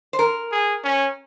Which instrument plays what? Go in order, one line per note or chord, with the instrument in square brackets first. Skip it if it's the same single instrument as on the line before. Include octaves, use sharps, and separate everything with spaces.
[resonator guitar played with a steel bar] C5
A#4
[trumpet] G#4
C#4